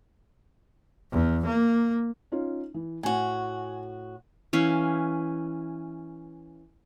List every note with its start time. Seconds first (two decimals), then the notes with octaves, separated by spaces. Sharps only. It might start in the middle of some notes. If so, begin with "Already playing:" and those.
1.11 E2
1.45 A#3
2.32 C#4 D#4 F4
2.74 E3
3.03 A2 F#4 G#5
4.53 E3 C#4 F5